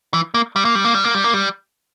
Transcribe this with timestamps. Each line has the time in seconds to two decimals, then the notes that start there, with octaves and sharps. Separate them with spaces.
0.14 E3
0.34 A#3
0.56 G3
0.65 A#3
0.75 G3
0.84 A#3
0.94 G3
1.04 A#3
1.15 G3
1.24 A#3
1.34 G3